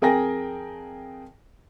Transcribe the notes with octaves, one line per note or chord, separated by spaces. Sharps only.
F2 G#4 A#4 G5 G#5 A#6